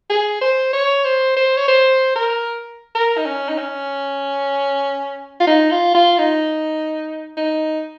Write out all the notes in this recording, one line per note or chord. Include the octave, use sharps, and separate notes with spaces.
G#4
C5
C#5
C5
C5
C#5
C5
A#4
A#4
D#4
C#4
D#4
C#4
F4
D#4
F4
F4
D#4
D#4